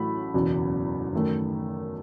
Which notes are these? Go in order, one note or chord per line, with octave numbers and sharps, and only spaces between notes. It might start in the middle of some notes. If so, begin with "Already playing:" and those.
Already playing: A1 A2 F#3 A3 B5
F#1 E2 B2 F#3
F#2 D#3 A3